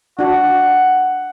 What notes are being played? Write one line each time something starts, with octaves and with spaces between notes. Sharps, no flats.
D4 F#4 F#5